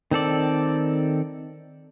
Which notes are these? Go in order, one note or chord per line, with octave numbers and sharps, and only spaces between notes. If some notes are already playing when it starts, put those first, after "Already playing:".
D#3 C4 A4 D5